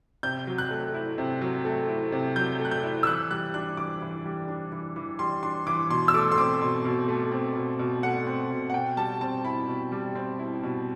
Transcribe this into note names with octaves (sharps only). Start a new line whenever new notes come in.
C3 G6
F#3
F#6
A3
E4
C3
F#3
A3
E4
C3
F#3 G6
A3
F#6
G6
E4
E6
E3 F#6
G3 F#6
D4 F#6
E3 D6
E3
G3
D4
E3
E3
G3 C6
D4 C6
E3 D6
B2 C6
E6
A3 D6
C6
C4 D6
B2
B2
A3
C4
B2
B2
A3 F#5
C4
B2
F#5
B2 G5
G3 A5
C4 A5
E4 B5
B2
G3
C4
E4
B2